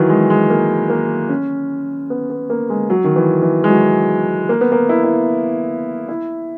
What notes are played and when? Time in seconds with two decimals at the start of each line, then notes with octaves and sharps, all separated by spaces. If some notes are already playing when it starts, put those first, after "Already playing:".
Already playing: D#3 E3 F#3
0.10 G#3
0.30 G#3
0.50 A#3
0.90 A#3
1.29 C#4
2.10 B3
2.30 B3
2.50 A#3
2.70 G#3
2.90 F#3
3.04 D#3
3.16 E3
3.42 E3
3.64 G#3
3.69 F#3
4.49 A#3
4.61 B3
4.72 A#3
4.89 E4
5.04 E4
6.09 E4